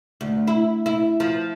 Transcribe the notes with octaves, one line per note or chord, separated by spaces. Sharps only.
D2
E4
E4
F3